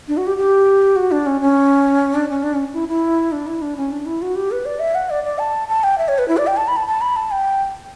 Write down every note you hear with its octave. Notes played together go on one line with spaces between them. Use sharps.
D4
F#4
G4
G4
F#4
D4
C#4
C#4
D4
C#4
D4
C#4
E4
E4
D4
E4
D4
C#4
D4
E4
F#4
G4
B4
D5
E5
F#5
D5
D5
A5
A5
G5
E5
C#5
B4
E4
D5
G5
A5
B5
A5
A5
B5
A5
G5